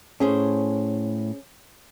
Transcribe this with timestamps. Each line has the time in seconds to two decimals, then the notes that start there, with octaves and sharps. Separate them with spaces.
0.20 A2 C#4 G#4 C5